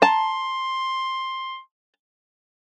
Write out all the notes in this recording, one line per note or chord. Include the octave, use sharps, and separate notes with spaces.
A5 A#5 C6